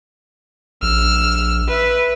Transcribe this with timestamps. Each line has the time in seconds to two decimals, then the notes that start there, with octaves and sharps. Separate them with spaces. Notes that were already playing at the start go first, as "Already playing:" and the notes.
0.82 A#1 E6 F6
1.68 B4 E5